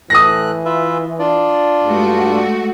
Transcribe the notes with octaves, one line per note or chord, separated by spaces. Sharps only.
A2 E3 A3 D#6 F#6 A#6
F4 B4 E5
D4 F4 D5
G2 G#3 A3 F#4